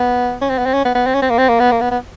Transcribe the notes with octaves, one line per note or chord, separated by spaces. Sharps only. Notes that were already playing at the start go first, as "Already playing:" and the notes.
Already playing: B3
C#4
C4
B3
C4
C#4
B3
B3
C4
C#4
C4
A#3
C4
A#3
B3
A#3
B3
B3